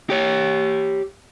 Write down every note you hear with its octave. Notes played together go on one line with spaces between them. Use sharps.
G4 C#5